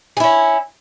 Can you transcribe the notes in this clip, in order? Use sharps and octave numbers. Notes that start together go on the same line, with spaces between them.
C#4 E4 G#4